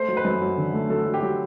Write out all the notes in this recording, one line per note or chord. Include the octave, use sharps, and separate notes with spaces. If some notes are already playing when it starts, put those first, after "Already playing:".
Already playing: A3 C5
F#3
B4
F#2
F#3
D3
A3
F#3 A4
F#3
G4
F#3